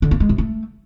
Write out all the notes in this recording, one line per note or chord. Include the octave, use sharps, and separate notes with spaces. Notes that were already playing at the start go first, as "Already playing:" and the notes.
D3
A#3
G#3
C3
A3